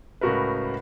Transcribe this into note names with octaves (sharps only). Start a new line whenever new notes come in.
C#2 A2 F#4 A#4 B4